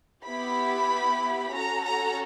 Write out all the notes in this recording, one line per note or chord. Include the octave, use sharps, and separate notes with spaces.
B3 E4 G4 B5
C#4 F#4 A4 A#5
A#5